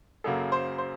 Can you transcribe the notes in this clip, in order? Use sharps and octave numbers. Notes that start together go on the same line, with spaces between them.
F#2 C#3 F#3 A#3 A4
C5
C5